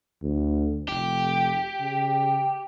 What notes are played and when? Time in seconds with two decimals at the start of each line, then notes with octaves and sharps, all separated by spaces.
0.22 D2
0.88 F1 G4
1.80 C#3